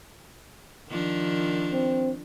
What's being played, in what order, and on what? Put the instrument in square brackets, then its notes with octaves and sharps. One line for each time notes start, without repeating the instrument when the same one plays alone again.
[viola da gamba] D#3 F3 D4
[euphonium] C4